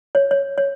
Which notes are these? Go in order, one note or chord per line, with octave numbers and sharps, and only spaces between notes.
C#5
C#5
C#5